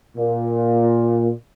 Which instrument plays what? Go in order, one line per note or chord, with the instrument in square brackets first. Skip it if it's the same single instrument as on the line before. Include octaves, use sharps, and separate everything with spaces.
[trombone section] A#2